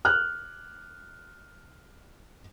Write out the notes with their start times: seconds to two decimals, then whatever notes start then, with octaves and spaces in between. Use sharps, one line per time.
0.05 F6 F#6